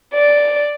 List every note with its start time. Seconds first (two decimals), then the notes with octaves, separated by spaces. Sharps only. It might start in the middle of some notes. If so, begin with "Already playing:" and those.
0.14 D5